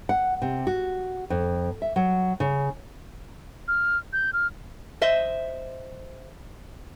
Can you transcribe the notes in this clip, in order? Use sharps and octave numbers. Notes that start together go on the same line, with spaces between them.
F#5
C3
F#4
F2
E5
F#3
C#3
F6
G6
F6
C5 D#5 E5